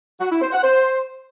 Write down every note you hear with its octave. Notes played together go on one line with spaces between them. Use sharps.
F#4
E4
C5
F#5
C5